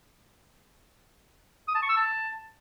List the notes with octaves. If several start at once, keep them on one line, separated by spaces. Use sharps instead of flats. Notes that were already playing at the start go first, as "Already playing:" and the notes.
D#6
A5
C#6
E6
A5